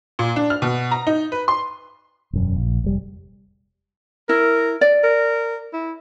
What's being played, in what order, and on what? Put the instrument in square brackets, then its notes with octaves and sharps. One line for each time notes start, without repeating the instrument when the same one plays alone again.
[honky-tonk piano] A#2
D4
F6
B2
A#5
D#4
B4
C6
[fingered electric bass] E1 F#2
A#1
F1 G3
[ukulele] E4 [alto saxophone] A#4
[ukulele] D5
[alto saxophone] A#4
E4